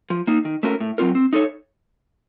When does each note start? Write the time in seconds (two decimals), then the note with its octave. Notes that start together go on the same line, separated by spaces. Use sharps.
0.10 F3
0.27 A#3 D#4
0.45 D#3
0.63 A3 C#4 F#4 A#4
0.80 A2
0.98 F#3 C4 F4 A#4
1.15 C4
1.33 D#4 A4 C#5